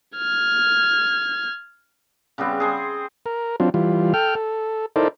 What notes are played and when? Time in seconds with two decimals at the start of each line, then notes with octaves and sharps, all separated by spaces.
0.18 F6 G#6
2.38 C#3 G3 B3 C4
2.60 G#4 C5 C6
3.26 A#4
3.60 F#3 C4 D4 F4
3.74 E3 G3 F4
4.14 A4 G5 F6
4.35 A4
4.96 D#4 E4 A4 A#4 C5 D5